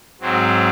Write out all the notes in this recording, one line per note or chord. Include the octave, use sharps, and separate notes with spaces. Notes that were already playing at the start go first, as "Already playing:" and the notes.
G#2 F#3 C4